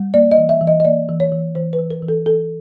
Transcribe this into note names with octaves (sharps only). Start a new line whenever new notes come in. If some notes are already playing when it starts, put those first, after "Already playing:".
Already playing: G3
A#3 D5
D#5
E3
E5
E3
D#5
D#5
A#3 D5
E3
C#5
E3
E3 C5
B4
E3
A#4
E3
A4
E3 A4